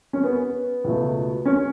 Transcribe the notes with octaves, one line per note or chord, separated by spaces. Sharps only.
C#4
B3
C#2 B2 A3
C#4